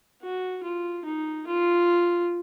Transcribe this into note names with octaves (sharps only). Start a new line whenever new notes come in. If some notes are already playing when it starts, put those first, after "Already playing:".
F#4
F4
D#4
F4